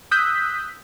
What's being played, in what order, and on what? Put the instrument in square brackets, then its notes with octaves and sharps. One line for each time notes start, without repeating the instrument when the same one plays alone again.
[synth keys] D#6 E6 F#6 G6 B6